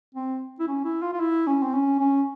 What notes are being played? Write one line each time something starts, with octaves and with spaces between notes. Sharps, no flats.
C4
E4
C#4
E4
F4
F4
E4
C#4
C4
C#4
C#4